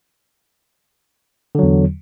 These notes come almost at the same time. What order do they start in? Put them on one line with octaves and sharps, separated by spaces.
D3 F#3 E2